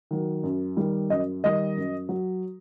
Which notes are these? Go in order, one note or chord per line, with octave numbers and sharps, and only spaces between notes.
D#3 F#3
F#2
D#3 G3
F#2 D#5
D#3 G3 D#5
F#2
F#3